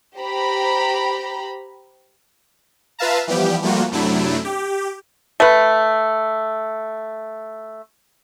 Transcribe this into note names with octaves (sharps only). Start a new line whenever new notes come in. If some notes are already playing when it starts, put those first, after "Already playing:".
G4 C5 A#5 B5
F4 B4 E5 F5 A5 A#5
E3 F3 G3 B3 G4
F3 G3 A3 A#3 F4 F#4
F#2 C3 F#3 A3 D4 E4
G4
A3 B4